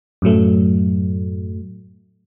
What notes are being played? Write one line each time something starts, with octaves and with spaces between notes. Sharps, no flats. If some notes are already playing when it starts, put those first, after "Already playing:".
F#2 A2 F#3 A3